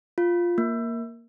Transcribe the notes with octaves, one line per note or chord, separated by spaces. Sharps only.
F4
A#3